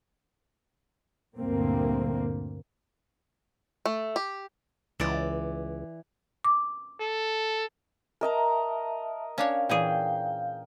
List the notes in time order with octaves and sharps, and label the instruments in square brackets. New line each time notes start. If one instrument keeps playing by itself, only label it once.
[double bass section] D2 G2 A#2 A#3 C4
[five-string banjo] A3
G4
[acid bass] C#2 [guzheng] E3 D5
[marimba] D6
[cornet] A4
[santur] A#4 D#5 A#5 [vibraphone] E5 A5
[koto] C#4 D4 C#5 [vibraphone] F5
[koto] A#2 E3 G#4 [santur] G5